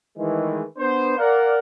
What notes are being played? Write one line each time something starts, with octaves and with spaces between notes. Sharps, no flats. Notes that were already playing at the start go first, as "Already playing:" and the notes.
D#3 E3 G#3 A3
B3 D4 C5
A#4 D5 F5 F#5